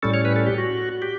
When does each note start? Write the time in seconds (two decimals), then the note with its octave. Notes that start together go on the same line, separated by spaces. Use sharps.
0.03 A2 G3 C#4 A4
0.14 C#5
0.25 B4
0.36 A4
0.47 G4
0.58 F#4
1.02 G4